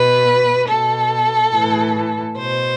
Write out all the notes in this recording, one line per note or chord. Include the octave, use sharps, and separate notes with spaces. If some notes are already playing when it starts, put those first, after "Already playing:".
Already playing: B2 B4
B2 A4
A2 E3
B2 C5